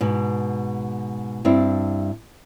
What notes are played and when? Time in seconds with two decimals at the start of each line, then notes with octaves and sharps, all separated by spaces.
0.01 G#2 B2
1.45 G2 C4 D4 E4